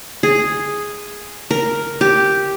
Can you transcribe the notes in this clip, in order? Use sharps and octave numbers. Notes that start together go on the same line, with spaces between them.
G#4
A#4
G4